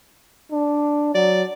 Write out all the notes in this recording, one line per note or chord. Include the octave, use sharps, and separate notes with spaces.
D4
F#3 D5